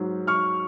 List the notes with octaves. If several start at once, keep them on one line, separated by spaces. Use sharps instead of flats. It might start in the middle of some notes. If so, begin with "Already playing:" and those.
Already playing: G#2 F#3
C#6 F6